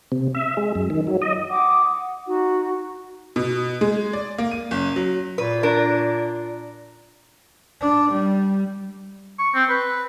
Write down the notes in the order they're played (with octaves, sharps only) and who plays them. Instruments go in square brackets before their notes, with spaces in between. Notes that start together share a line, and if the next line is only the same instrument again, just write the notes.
[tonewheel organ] C3
E5
G#3
F#2
D#3
F#3
D#5
[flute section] F#5 G5 D6 D#6
F#5
D#4 F#4
[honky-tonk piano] B2
G#3
D5
A#3
D#7
F#1
F#3
[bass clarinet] A#2 [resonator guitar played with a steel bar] B4
[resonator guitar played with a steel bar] D4 A#4
[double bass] D4
G3
[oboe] C#6
C4
B4